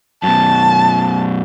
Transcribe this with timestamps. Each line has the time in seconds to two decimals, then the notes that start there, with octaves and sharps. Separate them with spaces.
0.23 F#2 B2 A5